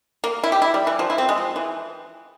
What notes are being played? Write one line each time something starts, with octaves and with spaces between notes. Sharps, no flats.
A#3
E4
G4
E4
G3
E3
F3
E4
C4
G#3
F3
E3